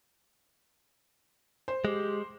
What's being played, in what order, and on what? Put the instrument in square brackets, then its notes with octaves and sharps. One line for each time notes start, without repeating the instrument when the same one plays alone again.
[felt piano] C5
[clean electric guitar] G#3 [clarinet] G4